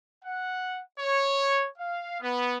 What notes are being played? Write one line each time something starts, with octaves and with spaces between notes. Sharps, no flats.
F#5
C#5
F5
B3